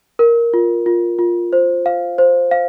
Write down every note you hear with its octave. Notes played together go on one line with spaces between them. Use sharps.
A#4
F4
F4
F4
C5
F5
C5
F5